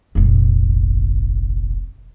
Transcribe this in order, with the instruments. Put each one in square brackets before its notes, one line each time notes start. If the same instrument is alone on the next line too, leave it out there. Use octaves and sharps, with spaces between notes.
[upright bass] F1 A#1